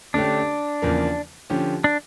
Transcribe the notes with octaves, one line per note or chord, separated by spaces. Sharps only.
D3 A3 C#4 D4 G4
E2 C#3 F3 A#3
D3 F3 C#4 G4
D4